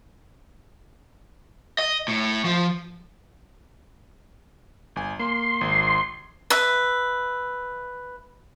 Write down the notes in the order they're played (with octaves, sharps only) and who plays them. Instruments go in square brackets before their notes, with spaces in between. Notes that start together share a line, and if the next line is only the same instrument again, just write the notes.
[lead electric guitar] D#5
A2
F3
[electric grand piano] G1 G#5
[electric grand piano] A#3 [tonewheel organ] C6
[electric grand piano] G#1
[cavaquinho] B4 E5